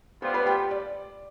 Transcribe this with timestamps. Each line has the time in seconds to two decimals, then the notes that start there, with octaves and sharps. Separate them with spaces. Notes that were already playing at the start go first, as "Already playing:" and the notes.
0.22 G3 B3 F4 C5 C6
0.34 B4 B5
0.46 G4 G5
0.71 D5